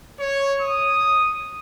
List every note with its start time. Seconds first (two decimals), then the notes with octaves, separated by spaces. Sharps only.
0.20 C#5
0.60 D#6